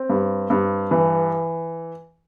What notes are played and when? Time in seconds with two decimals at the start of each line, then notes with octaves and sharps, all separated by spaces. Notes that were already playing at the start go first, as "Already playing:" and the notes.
Already playing: C4
0.09 G2
0.50 G2
0.91 E3